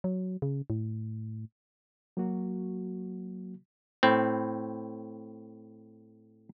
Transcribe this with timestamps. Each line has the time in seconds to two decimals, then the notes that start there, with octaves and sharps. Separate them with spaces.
0.04 F#3
0.42 C#3
0.70 A2
2.17 F#3 A#3 F#4
4.03 A2 C4